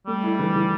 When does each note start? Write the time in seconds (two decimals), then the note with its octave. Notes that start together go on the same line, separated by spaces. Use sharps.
0.07 G3 A3
0.23 E4
0.39 E3
0.54 E3